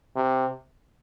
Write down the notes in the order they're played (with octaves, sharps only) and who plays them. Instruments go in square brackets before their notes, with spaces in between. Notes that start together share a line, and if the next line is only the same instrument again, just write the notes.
[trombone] C3